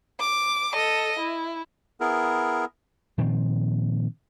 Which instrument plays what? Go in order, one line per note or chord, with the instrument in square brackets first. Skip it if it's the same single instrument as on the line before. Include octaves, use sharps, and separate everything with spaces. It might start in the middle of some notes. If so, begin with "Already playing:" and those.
[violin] D6
A4 D#5
E4
[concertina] B3 E4 G#4 A#4
[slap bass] A#2 D#3 F3 C4